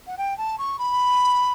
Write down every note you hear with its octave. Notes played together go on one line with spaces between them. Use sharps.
F#5
G5
A5
C#6
B5